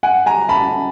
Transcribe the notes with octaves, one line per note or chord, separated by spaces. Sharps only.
F#5 G#5
G#5 A#5
A5 B5